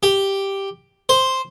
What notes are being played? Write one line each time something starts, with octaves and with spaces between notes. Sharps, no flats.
G4
C5